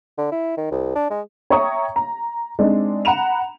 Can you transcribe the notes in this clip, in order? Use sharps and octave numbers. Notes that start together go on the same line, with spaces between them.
D3
E4
D#3
C2
D4
G#3
C#5 E5 G5 A#5 C#6 D#6
A#5
G#3 C4 D4 D#4
F#5 A#5 B5 E7 F7